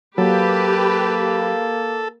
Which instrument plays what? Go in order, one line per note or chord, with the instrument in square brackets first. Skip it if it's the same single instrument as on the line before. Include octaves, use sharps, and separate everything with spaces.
[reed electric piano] F#3 [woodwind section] A#3 [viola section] G4 B4 [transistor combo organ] A4